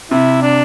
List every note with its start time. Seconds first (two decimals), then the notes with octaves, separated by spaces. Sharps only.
0.11 C3 E4
0.42 D4